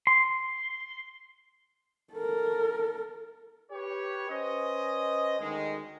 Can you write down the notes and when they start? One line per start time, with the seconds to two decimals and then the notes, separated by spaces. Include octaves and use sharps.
0.07 C6
2.14 A4 A#4
3.72 G4 B4 C#5
4.30 C#4 B4 C5 D#5
5.39 D2 D#3 G#3